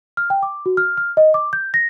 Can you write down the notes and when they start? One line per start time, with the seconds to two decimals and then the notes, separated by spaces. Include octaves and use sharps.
0.17 F6
0.30 G5
0.43 D6
0.66 F#4
0.77 F6
0.98 F6
1.17 D#5
1.34 D6
1.53 G6
1.74 A#6